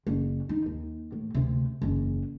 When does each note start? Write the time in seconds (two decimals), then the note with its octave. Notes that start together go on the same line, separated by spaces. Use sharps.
0.07 F#1
0.49 D#4
0.66 D#2
1.12 A2
1.34 D2 C3
1.82 F#1 E2